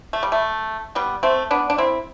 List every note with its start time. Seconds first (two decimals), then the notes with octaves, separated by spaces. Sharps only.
0.13 A3
0.23 G3
0.32 A3
0.95 G3 B3
1.23 A3 C4
1.51 B3 D4
1.70 D4
1.78 C4 E4